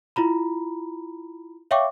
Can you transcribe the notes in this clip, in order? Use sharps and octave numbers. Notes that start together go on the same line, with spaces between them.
E4 F4 A#5 B5
C#5 E5 F5 G5 C#6 D6